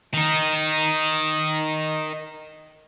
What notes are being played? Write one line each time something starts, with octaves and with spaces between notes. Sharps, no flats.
D#3 D#4